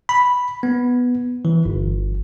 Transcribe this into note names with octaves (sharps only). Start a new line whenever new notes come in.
B5
B3
E3
G1